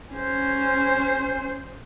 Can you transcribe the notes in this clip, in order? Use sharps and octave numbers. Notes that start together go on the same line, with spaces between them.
C#4 C5